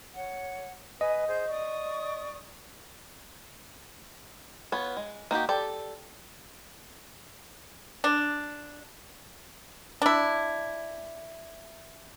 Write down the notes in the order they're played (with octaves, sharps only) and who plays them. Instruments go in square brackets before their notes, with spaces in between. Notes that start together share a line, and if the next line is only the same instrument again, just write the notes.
[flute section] C#5 F#5
[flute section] B4 G#5 [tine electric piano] D#5
[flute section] G#4 C5 G6
D5 C#6 D#6
[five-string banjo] B3 F4 C#5
G#3
A#3 D#4 F#4 G4
G4 A4 D5
[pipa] D4
D4 E4